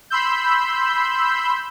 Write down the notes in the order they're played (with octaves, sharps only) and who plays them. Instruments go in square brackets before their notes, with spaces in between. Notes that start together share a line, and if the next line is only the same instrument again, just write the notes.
[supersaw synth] B5 C6 E6 G6